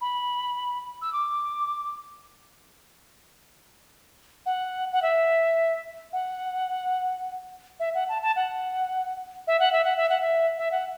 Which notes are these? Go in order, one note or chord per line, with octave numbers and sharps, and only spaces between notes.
B5
E6
D6
F#5
F#5
E5
F#5
E5
F#5
A5
A5
F#5
E5
F#5
E5
F#5
E5
F#5
E5
E5
F#5